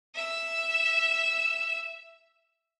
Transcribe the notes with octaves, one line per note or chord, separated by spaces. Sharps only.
E5 E6